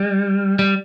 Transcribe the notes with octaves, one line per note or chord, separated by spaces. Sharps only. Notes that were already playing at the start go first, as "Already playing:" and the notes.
Already playing: G3
G3